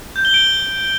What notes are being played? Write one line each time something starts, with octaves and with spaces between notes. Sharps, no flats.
G6
G7
D7